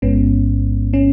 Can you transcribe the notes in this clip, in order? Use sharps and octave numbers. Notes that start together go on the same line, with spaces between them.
A1 G#2 G#3 B3 C#4
C#4